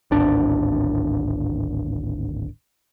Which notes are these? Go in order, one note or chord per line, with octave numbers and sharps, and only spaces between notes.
D1 G#1 D4